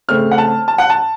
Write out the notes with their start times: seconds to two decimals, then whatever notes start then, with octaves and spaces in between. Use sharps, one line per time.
0.08 C#3 A3 C4 F6
0.31 F#5
0.38 A5
0.68 A5
0.78 F#5
0.90 A5